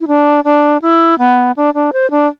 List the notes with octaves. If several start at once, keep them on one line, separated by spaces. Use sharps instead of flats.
E4
D4
D4
E4
B3
D4
D4
C5
D4